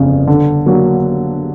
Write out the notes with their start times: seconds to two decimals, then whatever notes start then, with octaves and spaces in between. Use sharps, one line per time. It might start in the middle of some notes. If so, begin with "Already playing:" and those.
Already playing: G1 F2 C#3
0.27 D3
0.66 F#3 A#3 D4 F#4